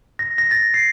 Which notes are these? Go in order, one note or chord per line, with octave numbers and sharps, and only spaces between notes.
A#6
A#6
A6
C7